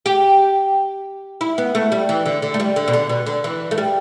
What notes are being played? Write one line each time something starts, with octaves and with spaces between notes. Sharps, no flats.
G4
E4
B3
A3
G3
E3
D3
D3
A3
G3
D3
B2
D3
B2
D3
E3
A3
G3